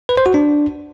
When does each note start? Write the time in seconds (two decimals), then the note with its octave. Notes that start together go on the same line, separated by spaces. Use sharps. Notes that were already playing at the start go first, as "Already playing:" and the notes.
0.09 B4
0.17 C5
0.26 F#4
0.34 D4